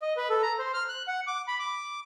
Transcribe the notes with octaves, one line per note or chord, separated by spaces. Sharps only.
D#5
B4
A4
A#5
C5
F6
F#6
F#5
D6
B5
D6